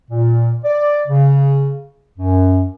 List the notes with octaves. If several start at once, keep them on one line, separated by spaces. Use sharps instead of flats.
A#2
D5
C#3
F#2